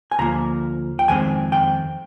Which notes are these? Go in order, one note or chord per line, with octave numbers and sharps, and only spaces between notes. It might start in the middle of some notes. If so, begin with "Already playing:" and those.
G#5
D2 C3 F3 A#3 A#5
G5
F2 D#3 G#3 C4 G#5
G5